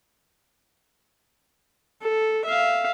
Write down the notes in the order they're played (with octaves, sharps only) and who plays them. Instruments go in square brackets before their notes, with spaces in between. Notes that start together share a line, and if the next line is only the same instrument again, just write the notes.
[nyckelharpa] A4
E5 F5